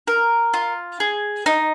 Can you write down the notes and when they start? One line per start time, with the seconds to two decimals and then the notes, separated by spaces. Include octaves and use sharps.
0.08 A#4
0.54 F4
1.00 G#4
1.46 D#4